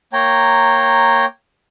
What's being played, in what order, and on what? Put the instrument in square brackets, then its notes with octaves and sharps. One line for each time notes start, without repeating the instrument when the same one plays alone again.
[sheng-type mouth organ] A#3 C#5 G5 A#5